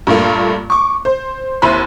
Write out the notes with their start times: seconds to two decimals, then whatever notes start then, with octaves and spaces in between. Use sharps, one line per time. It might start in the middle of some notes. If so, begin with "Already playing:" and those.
0.07 G2 A#2 A3 A#3 F4
0.70 C#6 D6
1.05 C5
1.62 D#2 C4 E4 B5 C6